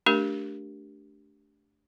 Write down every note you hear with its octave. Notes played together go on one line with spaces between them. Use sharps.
A3 D4 G4 A#4